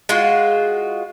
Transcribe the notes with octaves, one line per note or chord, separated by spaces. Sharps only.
G#3 F4 F#4